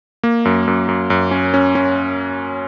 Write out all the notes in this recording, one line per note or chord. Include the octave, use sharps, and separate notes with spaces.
A#3
F#2
F#2
F#2
F#2
C#4
C#4
C#4